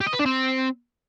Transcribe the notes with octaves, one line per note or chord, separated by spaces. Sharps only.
G4
D#5
B4
D4
C4